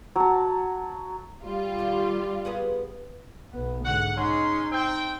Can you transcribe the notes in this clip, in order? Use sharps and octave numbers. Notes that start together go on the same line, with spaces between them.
F#3 A5
G3 F4
B2 D#3
B3 G#4 B4
B1 B3
G#2 D3 F#5
G#3 C#4 D#4 C6
C4 G5